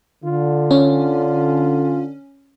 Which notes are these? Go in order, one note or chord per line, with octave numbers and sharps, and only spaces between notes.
D3 F4
C#4